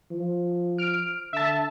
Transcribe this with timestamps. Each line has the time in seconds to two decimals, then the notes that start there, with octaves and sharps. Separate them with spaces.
0.11 F3
0.78 F6 D7
1.33 D3 E5 A5